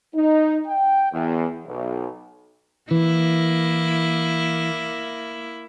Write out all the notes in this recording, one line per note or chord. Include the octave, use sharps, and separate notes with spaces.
D#4
G5
E2
B1
E3 A#3 E4